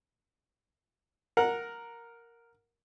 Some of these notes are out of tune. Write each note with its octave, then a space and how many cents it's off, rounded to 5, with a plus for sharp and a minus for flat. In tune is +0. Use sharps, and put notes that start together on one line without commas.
A#4 +0 F#5 -20